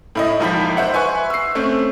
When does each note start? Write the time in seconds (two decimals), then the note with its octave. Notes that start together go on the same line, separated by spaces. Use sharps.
0.15 A2 E4 D#5
0.40 E1 D#2 F3 B5 B6
0.77 C5 E5 F#5
0.93 B4 E5 G#5 C6 C#6 F#6
1.30 E6 C7
1.55 A3 C4 C#4